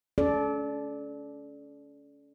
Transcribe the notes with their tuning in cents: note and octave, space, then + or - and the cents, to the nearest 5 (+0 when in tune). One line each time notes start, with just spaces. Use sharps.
C#4 +30 A4 -35 D5 +0